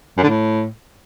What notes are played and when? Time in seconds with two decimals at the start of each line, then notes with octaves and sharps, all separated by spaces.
0.17 F#2
0.23 D3
0.29 A2